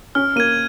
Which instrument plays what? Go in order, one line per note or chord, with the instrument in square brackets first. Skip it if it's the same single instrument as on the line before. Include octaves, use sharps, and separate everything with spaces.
[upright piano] C#4 [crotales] F6
[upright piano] A#3 [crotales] G#6 D#7